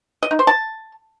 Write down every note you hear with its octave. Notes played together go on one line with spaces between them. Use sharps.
D#5
D#4
C5
A5